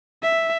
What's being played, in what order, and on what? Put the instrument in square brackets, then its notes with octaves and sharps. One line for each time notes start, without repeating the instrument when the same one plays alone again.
[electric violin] E5